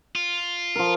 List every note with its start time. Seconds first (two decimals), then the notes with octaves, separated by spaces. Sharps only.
0.15 F4
0.76 F3 A#4